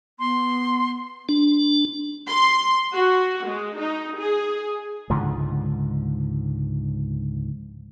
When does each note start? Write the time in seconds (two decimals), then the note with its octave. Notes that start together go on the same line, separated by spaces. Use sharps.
0.19 B3 C6
1.29 D4
2.27 C6
2.94 F#4
3.47 G#3
3.79 D#4
4.19 G#4
5.10 C#2 G#2 D3 F3